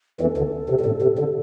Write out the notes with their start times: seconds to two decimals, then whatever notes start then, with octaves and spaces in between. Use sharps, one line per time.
0.21 E2 E3 A4
0.37 D2 D3
0.70 C3
0.81 G2
0.86 A2
1.02 C3
1.19 D3